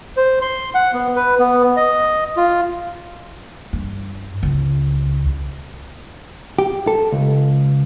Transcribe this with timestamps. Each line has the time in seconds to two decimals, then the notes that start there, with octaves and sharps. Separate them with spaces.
0.17 C5
0.42 C6
0.75 F#5
0.93 B3
1.16 B4
1.39 B3
1.77 D#5
2.37 F4
3.73 G2
4.43 C#2
6.59 G4
6.87 A4
7.12 C#2